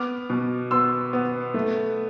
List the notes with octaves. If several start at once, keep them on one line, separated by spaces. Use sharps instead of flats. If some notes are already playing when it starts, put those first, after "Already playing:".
Already playing: B3 D6 F6
B2
B3 C6 E6
B3
A3